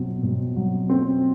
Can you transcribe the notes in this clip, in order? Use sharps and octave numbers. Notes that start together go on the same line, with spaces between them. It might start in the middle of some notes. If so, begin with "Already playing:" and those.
Already playing: B2 F#3 C4
B2
F#3
C4